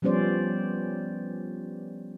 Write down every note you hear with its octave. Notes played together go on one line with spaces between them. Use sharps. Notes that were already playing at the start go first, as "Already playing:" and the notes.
F3 G3 B3 C#4 C5 D5